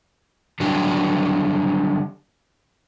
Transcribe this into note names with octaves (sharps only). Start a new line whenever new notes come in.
D3 D#3 F#3 G3 D4 G4